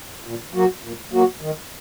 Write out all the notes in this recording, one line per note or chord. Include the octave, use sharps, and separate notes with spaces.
A#2
F#3 A#3 F#4
A#2
F#3 A#3 F#4
D#3